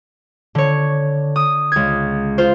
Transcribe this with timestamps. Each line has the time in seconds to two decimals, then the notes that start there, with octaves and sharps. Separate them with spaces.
0.55 D3 C#5
1.36 D#6
1.72 C#2 G#6
2.38 F4 C5